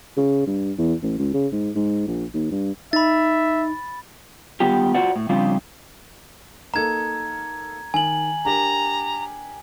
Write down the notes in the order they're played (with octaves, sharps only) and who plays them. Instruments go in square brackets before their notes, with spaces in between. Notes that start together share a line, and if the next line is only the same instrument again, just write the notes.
[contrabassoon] C#3
G2
E2
A1
C#2
C#3
G#2
G#2
A#1
D#2
G2
[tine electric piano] D#4 [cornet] E5 [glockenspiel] B5 A6
[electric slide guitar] D#3 G3 B3 F4 G4
F4 F#4 C5 D5 F#5
A2
C#3 F3 G3 C4 D4 F4
[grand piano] A#3 D#4 A4 [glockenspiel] A#5 G#6
[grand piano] D#3 [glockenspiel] G#5 F#7
[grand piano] D4 G4 A#4 [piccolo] A#5